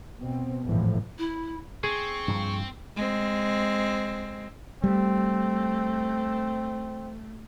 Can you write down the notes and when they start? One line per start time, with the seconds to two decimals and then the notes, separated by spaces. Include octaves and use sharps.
0.19 B2 C4
0.65 G#1 E2 A2 D3 E3 F3
1.18 E4
1.84 C4 G#4 C#6
2.28 G2 A#2 F3
2.96 G#3 C4
4.84 G3 A3 C4